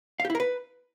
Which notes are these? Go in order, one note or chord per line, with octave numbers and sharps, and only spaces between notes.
F5
G4
E4
A#4
B4